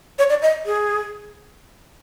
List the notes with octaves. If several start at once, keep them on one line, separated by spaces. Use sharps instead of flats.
C#5
D5
D#5
G#4